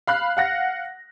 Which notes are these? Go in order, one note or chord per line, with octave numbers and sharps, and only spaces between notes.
F5 B5 F#6
F5 F#5 A#6